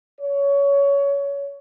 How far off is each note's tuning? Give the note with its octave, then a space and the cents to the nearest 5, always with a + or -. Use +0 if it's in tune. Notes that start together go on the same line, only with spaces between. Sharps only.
C#5 +20